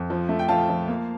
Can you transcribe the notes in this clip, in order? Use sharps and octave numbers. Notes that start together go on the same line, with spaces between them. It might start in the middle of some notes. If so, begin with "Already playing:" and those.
Already playing: F2
F3
A3
G5
F3 F5 A5
F3
A#3